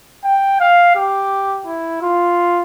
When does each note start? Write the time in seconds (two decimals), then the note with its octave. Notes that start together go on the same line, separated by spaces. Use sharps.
0.24 G5
0.60 F5
0.96 G4
1.66 E4
2.02 F4